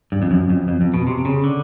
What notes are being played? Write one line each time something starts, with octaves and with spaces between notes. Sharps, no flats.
G2
F2
F#2
F2
F2
F2
B2
C3
C#3
D3